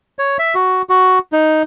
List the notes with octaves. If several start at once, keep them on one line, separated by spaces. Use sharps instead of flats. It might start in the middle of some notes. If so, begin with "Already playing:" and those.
C#5
E5
F#4
F#4
D#4